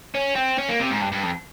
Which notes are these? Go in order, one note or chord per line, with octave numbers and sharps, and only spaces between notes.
C#4
C4
C#4
A#3
C3
G#2
G2
G2
F2